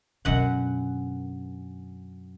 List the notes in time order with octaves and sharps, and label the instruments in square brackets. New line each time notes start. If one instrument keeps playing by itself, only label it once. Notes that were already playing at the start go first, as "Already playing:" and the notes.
[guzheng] F#2 F#5 [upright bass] B2 D3